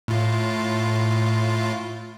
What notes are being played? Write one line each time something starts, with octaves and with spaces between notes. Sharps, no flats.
A2 F4